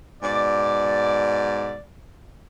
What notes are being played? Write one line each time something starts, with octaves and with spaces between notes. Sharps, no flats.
G#2 B2 D5